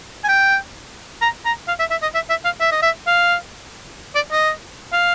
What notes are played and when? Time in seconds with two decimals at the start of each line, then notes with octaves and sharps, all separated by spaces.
0.24 G#5
0.29 G5
1.22 A#5
1.45 A#5
1.68 F5
1.80 E5
1.91 E5
2.02 D#5
2.15 E5
2.30 E5
2.45 F5
2.61 E5
2.72 D#5
2.83 E5
3.07 F5
4.15 D5
4.32 D#5
4.93 F5